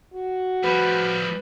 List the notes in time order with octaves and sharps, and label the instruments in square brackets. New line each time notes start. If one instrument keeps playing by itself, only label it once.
[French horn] F#4
[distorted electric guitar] F3 G3 [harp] B4